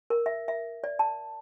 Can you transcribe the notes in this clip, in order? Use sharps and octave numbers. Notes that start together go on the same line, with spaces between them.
A#4
E5
E5
D5
A5